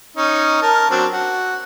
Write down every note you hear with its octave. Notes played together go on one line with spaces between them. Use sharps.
C#4 D#4
A#4 A5
F#3 C4 D4
F#4